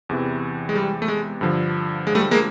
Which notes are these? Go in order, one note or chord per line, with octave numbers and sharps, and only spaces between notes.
E2 C3 E3
G#3
G3
A3
G#3
G2 D3 F3
G#3
G3 A3
G#3 A#3